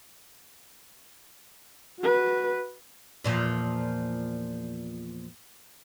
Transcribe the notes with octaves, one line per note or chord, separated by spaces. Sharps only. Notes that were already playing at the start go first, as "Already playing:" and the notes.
F#4 B4
E2 A#2 F3